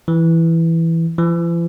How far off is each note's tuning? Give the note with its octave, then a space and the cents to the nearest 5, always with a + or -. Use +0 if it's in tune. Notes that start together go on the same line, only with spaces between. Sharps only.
E3 +0
E3 +45